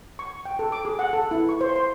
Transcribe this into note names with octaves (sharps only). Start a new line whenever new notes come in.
C#6
G5
A4
D6
G#4
F#5
A4
E4
C#6
C5
C6